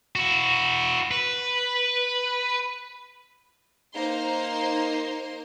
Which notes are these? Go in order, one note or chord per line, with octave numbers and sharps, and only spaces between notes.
E4 F#4
B4
A#3 D#4 C5 A#5 C6